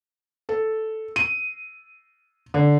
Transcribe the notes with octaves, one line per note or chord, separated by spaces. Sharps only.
A4
D#7
D3